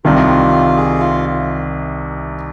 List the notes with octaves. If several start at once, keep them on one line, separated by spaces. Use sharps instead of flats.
C2 C3 D#3 F4
G#4
F4